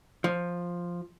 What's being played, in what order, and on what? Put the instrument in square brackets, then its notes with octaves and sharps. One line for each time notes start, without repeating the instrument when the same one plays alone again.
[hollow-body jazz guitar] F3